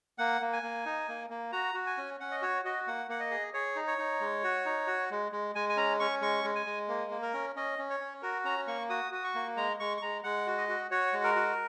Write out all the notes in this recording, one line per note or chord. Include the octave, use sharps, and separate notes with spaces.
A#3 F#5
A#3
G#5
A#3
D#4
A#3
A#3
F#4 A#5
F#4
G#5
C#4
C#4 F#5
D#5
F#4 C#5
F#4 D#5
A#3 F#5
A#3 F#5
D#5
G#4
G#4 C#5
D#4
C#5
D#4
G#3
F#4
D#4
F#4
G#3
G#3
G#3 G#5
G#5
C#4 A#5
C#4 C#6
G#3 C#6
G#3
G#5
G#3
A#3
A#3
A#4
C#4
C#4 D#5
C#4
C#5
C#4
F#4 A#4
C#4 A#5
A#3 C#6
F#4 D#6
F#4 D#6
C#6
A#3
G#3 A#5
G#3 C#6
C#6
G#3 A#5
G#3 F#5
F#4
D#5
F#4
F#4 C#5
G#3
A#4
F#4